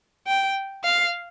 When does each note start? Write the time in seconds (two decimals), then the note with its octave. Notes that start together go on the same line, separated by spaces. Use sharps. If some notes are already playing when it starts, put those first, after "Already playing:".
0.27 G5
0.84 F5